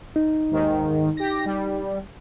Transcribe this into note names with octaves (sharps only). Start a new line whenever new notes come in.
D#4
D#2 G#2 D#3
G4 A#6
G3